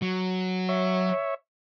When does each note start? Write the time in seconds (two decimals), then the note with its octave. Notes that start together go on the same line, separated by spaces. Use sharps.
0.02 F#3
0.69 C#5 E5